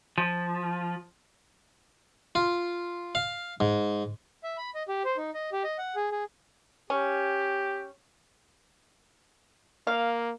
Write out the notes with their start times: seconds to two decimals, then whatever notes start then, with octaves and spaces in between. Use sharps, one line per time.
0.18 F3
2.35 F4
3.15 F5
3.60 G#2
4.43 E5
4.57 B5
4.75 D#5
4.88 G4
5.05 C5
5.17 D#4
5.34 D#5
5.52 G4
5.64 D#5
5.78 F#5
5.96 G#4
6.11 G#4
6.90 C#4 G4
9.87 A#3 F5